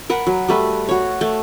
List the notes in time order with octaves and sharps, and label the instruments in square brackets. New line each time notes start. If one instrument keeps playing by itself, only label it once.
[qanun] A#4 B4 F#5
F#3
G3 A3 B4
F#4 C#5
A3